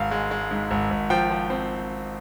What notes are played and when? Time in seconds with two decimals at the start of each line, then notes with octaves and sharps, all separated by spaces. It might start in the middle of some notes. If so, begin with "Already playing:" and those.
Already playing: G#1 F5
0.11 G#3
0.31 G#3
0.51 G#2
0.71 G#1
0.91 G#1
1.10 F3 G5
1.30 F3
1.50 C4